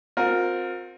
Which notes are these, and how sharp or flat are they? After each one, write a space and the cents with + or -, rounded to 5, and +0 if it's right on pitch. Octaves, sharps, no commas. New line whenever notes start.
C4 +0 F4 +45 A#4 +0